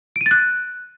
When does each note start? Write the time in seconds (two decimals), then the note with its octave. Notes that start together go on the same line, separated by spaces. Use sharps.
0.16 D7
0.21 D#7
0.26 A6
0.31 F#6